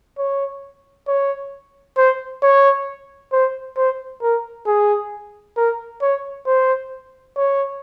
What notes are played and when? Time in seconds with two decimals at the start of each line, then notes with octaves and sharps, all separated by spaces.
0.18 C#5
1.08 C#5
1.97 C5
2.43 C#5
3.33 C5
3.77 C5
4.22 A#4
4.67 G#4
5.57 A#4
6.02 C#5
6.46 C5
7.37 C#5